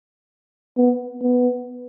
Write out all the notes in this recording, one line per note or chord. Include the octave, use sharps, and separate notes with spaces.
B3
B3